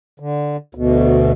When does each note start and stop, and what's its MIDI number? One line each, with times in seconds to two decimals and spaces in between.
0.20 0.56 50
0.75 1.32 38
0.75 1.32 47